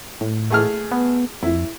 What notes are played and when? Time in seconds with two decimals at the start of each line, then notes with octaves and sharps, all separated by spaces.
0.21 A2
0.50 A3 G#4 F6
0.92 B3
1.43 F2 E4